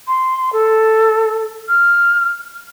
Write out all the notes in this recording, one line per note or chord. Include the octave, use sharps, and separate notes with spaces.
C6
A4
F6